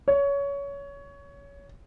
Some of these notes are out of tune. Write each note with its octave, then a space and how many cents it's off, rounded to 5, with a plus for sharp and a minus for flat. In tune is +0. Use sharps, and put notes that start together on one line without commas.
C#5 +20